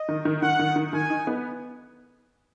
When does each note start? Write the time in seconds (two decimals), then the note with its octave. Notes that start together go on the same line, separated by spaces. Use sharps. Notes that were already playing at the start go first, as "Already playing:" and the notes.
Already playing: D#5
0.09 D#3
0.25 D#3
0.42 D#3 F#5
0.59 D#3
0.76 D#3
0.93 D#3 G#5
1.10 D#4
1.27 B3